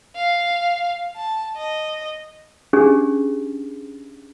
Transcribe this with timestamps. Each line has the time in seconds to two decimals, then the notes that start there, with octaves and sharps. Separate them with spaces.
0.15 F5
1.16 A5
1.57 D#5
2.73 C#4 D4 G4 G#4